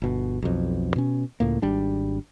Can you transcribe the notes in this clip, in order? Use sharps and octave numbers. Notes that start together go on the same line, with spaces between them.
G1 B2
B1 F2
B2 C#4
C#2 A2 A#3
G#1 G3 D4